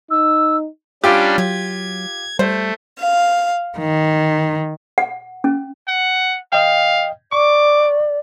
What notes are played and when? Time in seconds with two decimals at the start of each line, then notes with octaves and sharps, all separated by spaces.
0.11 D#4 E6
1.04 G3 C#4 D4 F4 G4
1.38 F#3 G#6
2.39 G3 A3 C5
2.99 F5
3.77 D#3
4.98 F#5
5.44 C#4
5.88 F#5
6.53 D#5 F5 G5
7.32 D5 C#6 D6